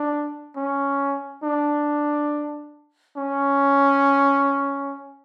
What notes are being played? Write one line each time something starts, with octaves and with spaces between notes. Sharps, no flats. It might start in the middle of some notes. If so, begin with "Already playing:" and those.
Already playing: D4
C#4
D4
C#4